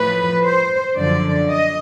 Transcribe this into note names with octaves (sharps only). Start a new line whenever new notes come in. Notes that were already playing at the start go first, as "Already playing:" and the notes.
Already playing: A2 F3 B4
C5
F#2 D3 F3 D5
D#5